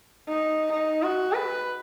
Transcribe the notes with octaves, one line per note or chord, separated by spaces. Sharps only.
D#4
D#4
F#4
B4